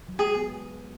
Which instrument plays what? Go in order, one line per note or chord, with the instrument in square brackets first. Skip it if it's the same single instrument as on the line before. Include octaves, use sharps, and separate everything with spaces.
[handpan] F#3
[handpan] G#3 [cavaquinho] G#4
[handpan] B3